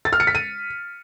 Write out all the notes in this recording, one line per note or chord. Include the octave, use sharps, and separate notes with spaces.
A6
F6
C#7
B6
D#7